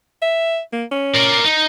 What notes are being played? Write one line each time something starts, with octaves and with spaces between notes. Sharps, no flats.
E5
A#3
C#4
A#4 D5
D#4